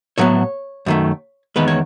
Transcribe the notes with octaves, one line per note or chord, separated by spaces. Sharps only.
A2 F#3 B3 C#5
F#2 D#3 A3
E2 D#3 G#3 B3 B4
C#5